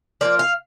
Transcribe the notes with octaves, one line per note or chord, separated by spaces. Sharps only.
F3 A#3 F4 D5
F5